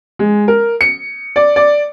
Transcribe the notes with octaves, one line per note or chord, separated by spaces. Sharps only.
G#3
A#4
C#7
D5
D5